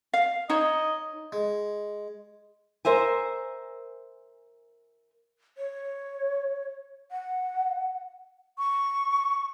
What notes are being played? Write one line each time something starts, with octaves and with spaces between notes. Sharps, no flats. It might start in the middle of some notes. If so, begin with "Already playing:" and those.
F5
D#4 C#5 D#5
G#3
A#4 C5 E5 G#5
C#5
F#5
C#6